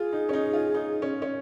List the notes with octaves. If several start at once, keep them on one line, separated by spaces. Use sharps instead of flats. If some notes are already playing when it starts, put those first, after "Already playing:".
Already playing: F4 G#4
D#4
C#4
D#4
F4
D#4
C#4
C#4